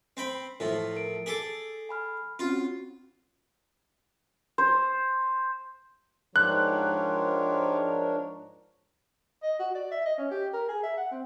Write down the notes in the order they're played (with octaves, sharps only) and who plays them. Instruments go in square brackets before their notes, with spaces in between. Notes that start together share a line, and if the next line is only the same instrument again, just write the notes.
[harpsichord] C4 G5 B5
[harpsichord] A2 F3 [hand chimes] E4
[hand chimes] A#4 D7
[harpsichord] G#4 A4 D6 [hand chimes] B6
[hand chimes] G#5 B5 F6
[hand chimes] C4 C#4 F#4 [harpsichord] F4
[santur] C5
[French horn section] G#2 F3 [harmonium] D4 A#4 C#5 [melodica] F4 G4 [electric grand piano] F#6
[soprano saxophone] D#5
F#4
D5
E5
D#5
C#4
G4
A#4
G#4
E5
F#5
C4